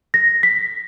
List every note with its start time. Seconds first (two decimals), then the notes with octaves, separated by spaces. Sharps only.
0.14 A#6
0.43 B6